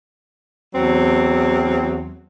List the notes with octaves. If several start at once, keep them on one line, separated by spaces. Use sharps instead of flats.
E2 F#3 C4